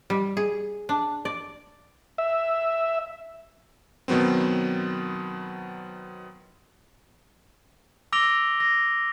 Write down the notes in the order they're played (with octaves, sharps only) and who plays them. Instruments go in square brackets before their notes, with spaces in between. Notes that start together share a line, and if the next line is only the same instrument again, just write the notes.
[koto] G3
G#4
D4
D5
[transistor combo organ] E5
[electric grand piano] B2 D#3 F#3 B3 C4
[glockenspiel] D6 E6 A#6 D7 F7 G7
A#6